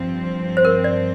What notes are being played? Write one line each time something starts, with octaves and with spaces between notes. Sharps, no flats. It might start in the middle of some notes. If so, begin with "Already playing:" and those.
Already playing: G2 F3 C4
C5
A#4
D5